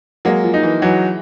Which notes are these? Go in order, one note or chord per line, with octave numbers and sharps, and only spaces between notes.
F#3 G#3 A#3
F3
D#4
E3
E3 F#3